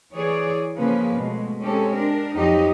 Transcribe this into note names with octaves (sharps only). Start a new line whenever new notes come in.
E3 G#4 C#5 D5
C#3 F3 A#3 C#4 B4
B2 G#3 A3
G#3 C4 C#4 G4 A4
D4 A#4
F2 F3 F#3 D#4 G4 D#5